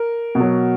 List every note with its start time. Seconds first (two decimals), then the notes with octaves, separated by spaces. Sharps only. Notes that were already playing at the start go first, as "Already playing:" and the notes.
Already playing: A#4
0.35 B2
0.40 F#3